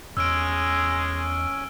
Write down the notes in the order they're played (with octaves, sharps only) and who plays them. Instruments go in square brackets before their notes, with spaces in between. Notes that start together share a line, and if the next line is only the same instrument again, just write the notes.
[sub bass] E2 [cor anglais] G#3 [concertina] C#4 G#5 [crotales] E6 F6 D7